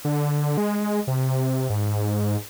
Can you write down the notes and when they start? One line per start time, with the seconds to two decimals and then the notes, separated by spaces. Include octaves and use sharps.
0.05 D3
0.57 G#3
1.07 C3
1.70 G#2